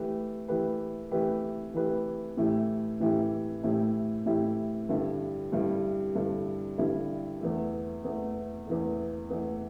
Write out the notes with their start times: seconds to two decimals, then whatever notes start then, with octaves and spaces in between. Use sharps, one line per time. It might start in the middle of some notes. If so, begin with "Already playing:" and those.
Already playing: E3 A3 G4 B4
0.48 E3 A3 G4 B4
1.11 E3 A3 G4 B4
1.74 E3 A3 G4 B4
2.37 A2 E3 A3 E4 G4
3.00 A2 E3 A3 E4 G4
3.64 A2 E3 A3 E4 G4
4.26 A2 E3 A3 E4 G4
4.89 G2 D3 G3 E4 A4
5.52 G2 D3 G3 E4 A4
6.15 G2 D3 G3 E4 A4
6.78 G2 D3 G3 E4 A4
7.41 E2 E3 A3
8.04 E2 E3 A3
8.67 E2 E3 A3
9.30 E2 E3 A3